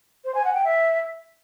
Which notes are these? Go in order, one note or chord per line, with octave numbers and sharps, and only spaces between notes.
C5
G#5
F#5
G5
E5